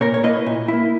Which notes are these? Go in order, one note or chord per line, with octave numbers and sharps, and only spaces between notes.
A#2 A#4 C#5
C#5
A#3 E4 B4 D#5
A#2
A#3 E4